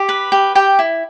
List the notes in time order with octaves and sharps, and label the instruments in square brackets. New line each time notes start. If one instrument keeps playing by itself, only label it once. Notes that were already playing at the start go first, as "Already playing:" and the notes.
Already playing: [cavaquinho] G4
B4
G4
G4 G5
E4